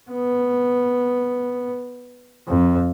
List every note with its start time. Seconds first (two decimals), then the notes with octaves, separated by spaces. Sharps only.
0.11 B3
2.48 F2